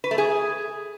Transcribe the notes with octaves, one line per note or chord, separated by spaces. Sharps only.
B4
A3
G#4